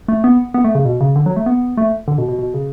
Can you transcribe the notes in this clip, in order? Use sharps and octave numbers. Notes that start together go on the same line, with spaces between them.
A3
B3
B3
A3
C#3
B2
C#3
D3
F#3
A3
B3
A3
D3
B2
B2
B2
C#3